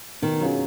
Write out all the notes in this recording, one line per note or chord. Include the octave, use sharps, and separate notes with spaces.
B2 D#3
F#3 C#4 F4 G#4